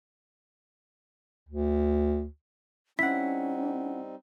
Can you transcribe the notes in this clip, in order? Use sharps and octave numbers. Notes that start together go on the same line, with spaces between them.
D2
G3 C4 C#4 D#4 E4 F#5 B6